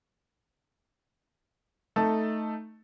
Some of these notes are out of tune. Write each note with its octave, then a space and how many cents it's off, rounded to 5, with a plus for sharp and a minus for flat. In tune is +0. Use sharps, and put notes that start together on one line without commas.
A3 +0 D#4 +0 A4 +5